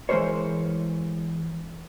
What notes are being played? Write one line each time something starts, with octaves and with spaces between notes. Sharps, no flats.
E3 G#3 A#3 A#4 C5 C#5